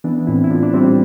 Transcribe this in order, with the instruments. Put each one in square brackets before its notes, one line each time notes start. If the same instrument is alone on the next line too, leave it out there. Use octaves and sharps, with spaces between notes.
[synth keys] E3 [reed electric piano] B3 D4
[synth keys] A2 [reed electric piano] C4 E4
[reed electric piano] E4
[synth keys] A2 [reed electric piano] D4 F4
[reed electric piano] D4
[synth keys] G3 [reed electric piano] C4 E4